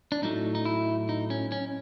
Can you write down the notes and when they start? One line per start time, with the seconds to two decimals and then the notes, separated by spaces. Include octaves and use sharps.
0.12 D4
0.22 A2 F#3 A3 D#4
0.55 D#4
0.65 E4
1.09 D#4
1.30 C#4
1.52 C#4